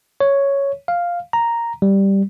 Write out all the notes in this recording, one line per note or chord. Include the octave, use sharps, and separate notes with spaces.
C#5
F5
A#5
G3